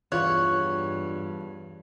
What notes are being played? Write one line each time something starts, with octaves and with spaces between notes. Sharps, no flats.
E2 G2 F4 C#5 F#6